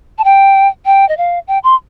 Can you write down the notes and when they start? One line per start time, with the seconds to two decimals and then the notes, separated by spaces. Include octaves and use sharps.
0.18 A5
0.24 G5
0.86 G5
1.09 D#5
1.17 F5
1.48 G5
1.64 C6